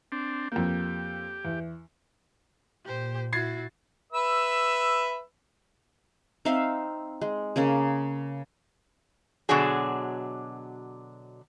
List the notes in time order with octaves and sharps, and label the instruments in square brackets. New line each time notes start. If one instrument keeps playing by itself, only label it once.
[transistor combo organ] C4 D4
[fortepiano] F2 A#3 [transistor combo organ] G4
[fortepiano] E2
[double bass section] A#2 [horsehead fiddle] G4 C5
[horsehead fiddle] E4 F#4 [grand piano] G#6 A6 C7
[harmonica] B4 E5 E6
[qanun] C4 D#4 E5 F5
G#3
C#3 A#3 C#4 G#4
[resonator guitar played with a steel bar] B2 D3 F#3 D4 G#4